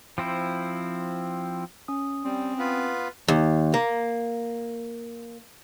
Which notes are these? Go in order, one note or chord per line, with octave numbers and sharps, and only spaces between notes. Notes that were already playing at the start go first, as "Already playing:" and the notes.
F3 C4 E4
C#4 D#6
G3 C4
B3 F4 B4
D#2
A#3